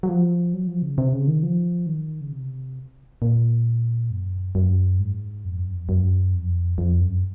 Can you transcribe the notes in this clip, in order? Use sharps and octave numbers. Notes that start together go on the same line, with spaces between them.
F#3
F3
F#3
F3
C#3
C3
C#3
D#3
F3
D#3
C#3
C3
A#2
F#2
F#2
G#2
F2
F#2
F2
F#2
F2
F2
F#2